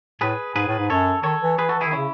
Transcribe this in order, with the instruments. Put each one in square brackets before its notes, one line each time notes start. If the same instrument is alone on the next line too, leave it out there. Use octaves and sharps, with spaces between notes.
[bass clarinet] A2 [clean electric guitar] G#4 B4
[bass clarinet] G#2 [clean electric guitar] G#4 B4
[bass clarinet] A2
G#2
[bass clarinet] F#2 [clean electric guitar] A4 C#5
[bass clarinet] D#3 [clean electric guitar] A4 C#5
[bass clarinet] E3
[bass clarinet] E3 [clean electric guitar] G#4 B4
[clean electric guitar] F#4 A4
[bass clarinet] E3
[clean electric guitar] E4 G#4
[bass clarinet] D#3
[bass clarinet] C#3 [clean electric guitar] C#4 E4